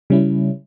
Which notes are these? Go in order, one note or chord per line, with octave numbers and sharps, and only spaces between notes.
C#3 G3 C#4 E4